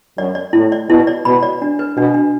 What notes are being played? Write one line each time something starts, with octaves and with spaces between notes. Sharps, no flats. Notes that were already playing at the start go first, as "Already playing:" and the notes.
F#2 D5
D5
A2 E4
D5
B2 E4
D5
B2 B5
D5
D4
B4
B2 D4
D4